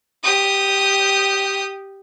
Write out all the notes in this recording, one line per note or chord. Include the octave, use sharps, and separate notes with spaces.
G4 D#6